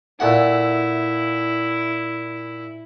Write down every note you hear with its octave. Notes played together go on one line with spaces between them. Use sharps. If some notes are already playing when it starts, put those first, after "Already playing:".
A#2 A3 E4 F#5